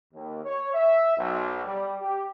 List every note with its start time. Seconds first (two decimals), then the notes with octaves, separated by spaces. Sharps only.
0.14 D#2
0.45 C#5
0.74 E5
1.17 B1
1.65 G3
2.01 G4